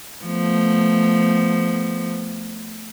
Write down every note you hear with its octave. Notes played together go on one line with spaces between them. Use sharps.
F3 A3 B3